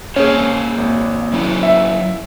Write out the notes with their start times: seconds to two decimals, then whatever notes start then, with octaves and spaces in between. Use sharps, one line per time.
0.16 A#3 C#4 G#4 C5 C#5
0.78 G#1
1.33 F#3 C#4 E4
1.63 E5